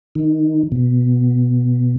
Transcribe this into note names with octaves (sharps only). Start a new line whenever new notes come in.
D#3
B2